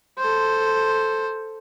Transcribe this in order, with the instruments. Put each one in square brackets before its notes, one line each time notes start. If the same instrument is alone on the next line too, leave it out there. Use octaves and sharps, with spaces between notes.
[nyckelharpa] A4 C5